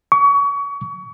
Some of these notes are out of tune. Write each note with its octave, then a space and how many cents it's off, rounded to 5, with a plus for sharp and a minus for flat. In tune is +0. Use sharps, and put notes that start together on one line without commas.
C#6 +30